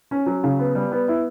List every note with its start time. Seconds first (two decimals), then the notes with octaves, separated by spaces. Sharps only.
0.11 C#4
0.26 F#3
0.43 C#3
0.59 B3
0.75 G3
0.92 B3
1.08 E4